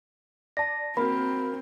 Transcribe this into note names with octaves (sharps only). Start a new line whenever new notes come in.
D5 A5 A#6
A#3 C4 F#4 A#4 B5